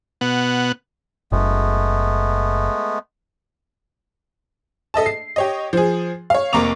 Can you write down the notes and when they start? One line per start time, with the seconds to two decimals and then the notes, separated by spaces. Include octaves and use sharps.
0.21 B2 B3 F#5
1.32 F#1 G#3 A3 B3
4.94 A4 D#5 E5 A5
5.06 C7
5.36 G4 C#5 D#5
5.73 F3 G#4
6.30 C#5 F5
6.53 F1 A#3 A#5 C#6 D6 F7